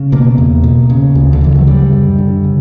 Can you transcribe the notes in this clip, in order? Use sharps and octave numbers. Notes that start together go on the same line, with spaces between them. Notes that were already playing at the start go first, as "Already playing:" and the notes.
Already playing: C#3
B2 A#3
E2
B2
C#3
D2
D3
C#3 E3
F#3
D3 G3
F#2
D3
C#3